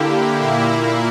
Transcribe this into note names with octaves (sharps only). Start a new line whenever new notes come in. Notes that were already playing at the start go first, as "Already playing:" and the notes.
Already playing: D3 A#3 E4 G4
A#2 A#3 E4